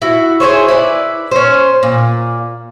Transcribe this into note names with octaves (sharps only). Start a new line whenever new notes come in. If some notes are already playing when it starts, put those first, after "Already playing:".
E4 F#4
E4 G#4 C5 C#5
E4 B4 C5 D5
C#4 C5
A#2